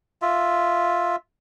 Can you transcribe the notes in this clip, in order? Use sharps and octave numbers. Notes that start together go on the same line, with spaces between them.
F4 E5